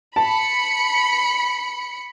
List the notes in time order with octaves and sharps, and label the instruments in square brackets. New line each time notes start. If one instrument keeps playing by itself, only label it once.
[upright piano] A5 [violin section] B5 C#7